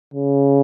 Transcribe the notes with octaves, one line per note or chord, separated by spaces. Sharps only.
C#3